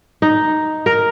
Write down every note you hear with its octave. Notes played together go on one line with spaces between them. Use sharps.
D#4
A#4